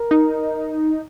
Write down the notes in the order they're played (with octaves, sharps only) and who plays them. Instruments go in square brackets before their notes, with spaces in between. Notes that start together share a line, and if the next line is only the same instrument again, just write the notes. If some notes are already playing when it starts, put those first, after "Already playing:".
Already playing: [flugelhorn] A#4
[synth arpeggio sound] D#4